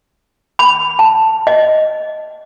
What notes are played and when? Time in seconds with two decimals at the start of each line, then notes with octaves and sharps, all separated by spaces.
0.59 B5
0.99 A5
1.47 D#5